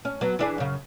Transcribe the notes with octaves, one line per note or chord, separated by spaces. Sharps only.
C#4
F#3 B3
E3 D4 G#4
F#2 C#3